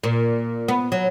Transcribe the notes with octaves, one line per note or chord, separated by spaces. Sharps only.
A#2
B3
F#3